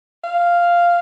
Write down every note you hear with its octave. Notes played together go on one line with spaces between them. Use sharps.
F5